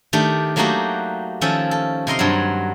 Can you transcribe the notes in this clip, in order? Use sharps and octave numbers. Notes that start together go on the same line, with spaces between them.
D#3 A3 D4 G4
F#3 A3 A#3 D#4 F#4 G4
D#3 F3 C#4 A4 E5
A4
C3 A#4 D#5 C6
G2 F#3